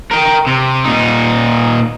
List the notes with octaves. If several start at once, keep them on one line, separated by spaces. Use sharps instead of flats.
A#4 G5
C3
A#2 D#4